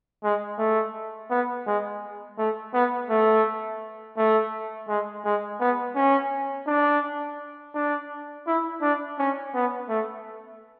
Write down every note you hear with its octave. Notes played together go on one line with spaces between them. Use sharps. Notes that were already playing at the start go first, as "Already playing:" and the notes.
G#3
A3
B3
G#3
A3
B3
A3
A3
G#3
G#3
B3
C#4
D4
D4
E4
D4
C#4
B3
A3